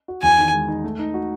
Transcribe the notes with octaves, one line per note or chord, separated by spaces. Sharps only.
F#4
E2 G#5
D#3
G#3
D#4
A3
D#4
F#4